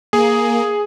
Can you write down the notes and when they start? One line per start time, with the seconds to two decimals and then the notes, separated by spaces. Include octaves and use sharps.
0.13 A#3 G#4